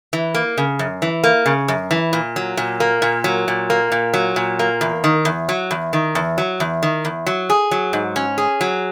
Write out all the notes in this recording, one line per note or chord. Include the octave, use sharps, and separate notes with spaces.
E3
A#3
C#3
F#2
E3
A#3
C#3
F#2
E3
A#2
F#3
A#2
A#3
A#2
F#3
A#2
A#3
A#2
F#3
A#2
A#3
E2
D#3
E2
F#3
E2
D#3
E2
F#3
E2
D#3
E2
F#3
G#4
F#3
G#2
C#4
G#4
F#3